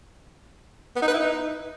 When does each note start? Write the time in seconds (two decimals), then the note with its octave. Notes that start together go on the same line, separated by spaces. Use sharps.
0.96 B3
1.02 D#4
1.08 B4
1.14 E4
1.19 D#4